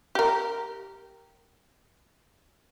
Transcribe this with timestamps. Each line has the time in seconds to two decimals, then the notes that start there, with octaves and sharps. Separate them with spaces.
0.15 G4 A#4